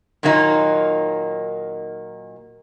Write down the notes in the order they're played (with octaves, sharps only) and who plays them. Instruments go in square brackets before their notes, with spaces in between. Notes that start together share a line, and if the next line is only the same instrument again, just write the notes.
[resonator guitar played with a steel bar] A#2 D#3 F#3 A#3 D#4